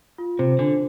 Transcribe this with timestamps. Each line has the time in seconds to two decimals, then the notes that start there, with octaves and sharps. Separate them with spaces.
0.18 F4
0.39 C3 C5
0.59 D3 D4